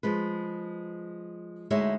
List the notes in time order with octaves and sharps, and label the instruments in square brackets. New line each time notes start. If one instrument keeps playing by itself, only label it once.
[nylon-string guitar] F3 G#3 B4
D2 G#3 D#4 E4 C#5 E5